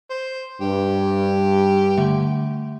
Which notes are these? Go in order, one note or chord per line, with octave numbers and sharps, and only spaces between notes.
C5
G2 G4
D3 A3 E5